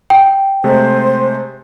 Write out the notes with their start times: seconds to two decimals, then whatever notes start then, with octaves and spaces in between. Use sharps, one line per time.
0.10 G5
0.64 C3 G#3 A3 C5